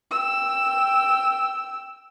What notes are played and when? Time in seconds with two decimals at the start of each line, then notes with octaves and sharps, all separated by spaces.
0.11 G5 E6